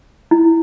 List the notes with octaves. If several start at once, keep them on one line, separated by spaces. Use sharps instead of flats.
E4